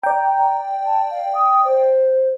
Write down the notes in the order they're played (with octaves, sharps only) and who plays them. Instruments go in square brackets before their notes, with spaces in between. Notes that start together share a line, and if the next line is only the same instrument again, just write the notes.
[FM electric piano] D5 G5 [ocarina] A#5
[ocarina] A5
F5
D#6
C5